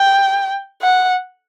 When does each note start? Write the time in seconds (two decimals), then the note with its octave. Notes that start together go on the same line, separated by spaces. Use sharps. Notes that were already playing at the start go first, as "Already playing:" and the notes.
Already playing: G5
0.82 F#5